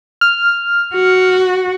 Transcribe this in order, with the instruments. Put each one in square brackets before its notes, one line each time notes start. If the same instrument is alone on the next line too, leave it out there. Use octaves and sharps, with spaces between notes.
[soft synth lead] F6
[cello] F#4